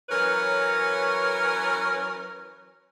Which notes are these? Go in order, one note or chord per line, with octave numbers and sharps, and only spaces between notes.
E3 F#3 C#4 A#4 B4 C#5